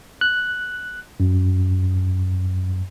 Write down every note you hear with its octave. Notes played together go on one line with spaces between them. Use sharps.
F#6
F#2